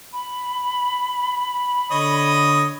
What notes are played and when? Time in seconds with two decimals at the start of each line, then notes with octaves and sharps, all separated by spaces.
0.13 B5
1.91 D3 C#5 D#5 D#6